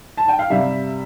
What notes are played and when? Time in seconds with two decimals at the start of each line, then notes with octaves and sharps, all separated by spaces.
0.17 A5
0.28 G5
0.39 F5
0.50 C3 G3 E5